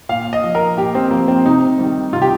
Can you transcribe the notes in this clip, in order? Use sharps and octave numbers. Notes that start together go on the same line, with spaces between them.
A#2 F5
D#5
F3
A#4
A#2 G4
C4
F3 A#3
C4
C3 D#4
D#3 G3
C3 F4
G4